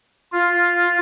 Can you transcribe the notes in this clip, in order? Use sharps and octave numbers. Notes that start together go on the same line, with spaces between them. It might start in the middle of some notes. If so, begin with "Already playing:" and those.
F4